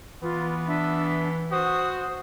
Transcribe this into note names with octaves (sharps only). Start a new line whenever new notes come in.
E3 B3 F4
D4 E5
F#4 C5 D#6